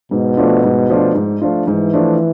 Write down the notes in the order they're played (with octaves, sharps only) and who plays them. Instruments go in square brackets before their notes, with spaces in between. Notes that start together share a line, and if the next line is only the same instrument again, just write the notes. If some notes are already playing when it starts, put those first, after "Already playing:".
[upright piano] G#2 [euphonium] B2
[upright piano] F3 A3 D4 F4
G#2
F3 A3 D4 F4
G#2
F3 A3 D4 F4
[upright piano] G#2 [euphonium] E3
[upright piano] F3 A3 D4 F4